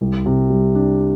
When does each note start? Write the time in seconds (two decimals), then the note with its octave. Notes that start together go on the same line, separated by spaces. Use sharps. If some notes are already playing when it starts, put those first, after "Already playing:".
0.01 C2
0.26 C3
0.50 G3
0.75 D4